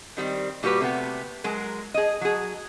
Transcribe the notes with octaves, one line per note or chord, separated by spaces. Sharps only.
D#3 G3 C4
A#2 G3 F#4 G4 B4
C3 A3 B3
F#3 G#3 A#4
G#4 D#5
F#3 G#4